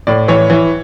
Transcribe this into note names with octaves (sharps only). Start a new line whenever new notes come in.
A2 D5
E3 C#5
E3